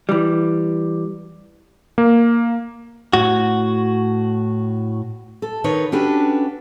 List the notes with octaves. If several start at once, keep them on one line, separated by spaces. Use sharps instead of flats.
E3 G3
A#3
A2 F#4
A4
D#3 D#4 B4 C#5
C#4 D4 F#4 G4 A4 B4